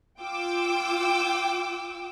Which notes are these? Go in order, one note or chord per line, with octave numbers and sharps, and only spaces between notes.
F4 G5 D6 E6